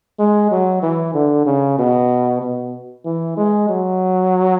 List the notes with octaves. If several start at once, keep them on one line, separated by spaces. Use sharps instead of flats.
G#3
F#3
E3
D3
C#3
B2
B2
E3
G#3
F#3